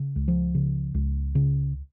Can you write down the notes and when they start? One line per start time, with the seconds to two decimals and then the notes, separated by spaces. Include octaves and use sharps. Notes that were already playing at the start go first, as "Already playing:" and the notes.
Already playing: C#3
0.16 C#2
0.28 F3
0.55 C#3
0.94 C#2
1.35 C#3